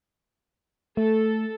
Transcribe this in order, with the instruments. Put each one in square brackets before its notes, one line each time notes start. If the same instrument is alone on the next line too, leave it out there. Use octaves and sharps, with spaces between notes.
[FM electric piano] A3 [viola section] A4